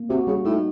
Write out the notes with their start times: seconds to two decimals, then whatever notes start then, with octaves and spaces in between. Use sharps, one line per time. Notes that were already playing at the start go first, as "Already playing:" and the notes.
Already playing: A#3
0.10 C3 F#4
0.27 C#3 G3
0.45 A2 D#4